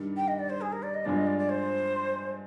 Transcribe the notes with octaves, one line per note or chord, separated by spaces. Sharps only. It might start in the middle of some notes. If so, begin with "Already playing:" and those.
Already playing: G2 D#3 G3 D4
G5
D#5
D5
C5
G#4
A#4
D5
D#5
G2 F3 G#3 D4 D5
D#5
D5
D5
C5